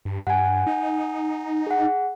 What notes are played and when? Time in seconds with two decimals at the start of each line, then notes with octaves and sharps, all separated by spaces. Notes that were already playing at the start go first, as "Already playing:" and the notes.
0.05 G2
0.27 G2 F#5 G#5
0.67 D#4
1.67 G#4 F#5